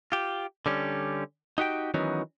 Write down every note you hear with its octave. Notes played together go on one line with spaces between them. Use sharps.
F4 G4
D3 G3 C#4
D#4 F#4 G4 G5
D#3 E3 F#3 B3 C#4 D#4